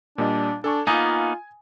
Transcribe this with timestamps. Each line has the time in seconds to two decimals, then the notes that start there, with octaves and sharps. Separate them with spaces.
0.18 A#2 G3 D4 D#5
0.64 D4 A4 G#5 C#6
0.87 A#3 B3 D#4 F4 G#5 D#6